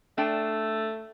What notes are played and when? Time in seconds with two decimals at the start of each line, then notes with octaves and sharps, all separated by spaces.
0.18 A3 D4 G5 A5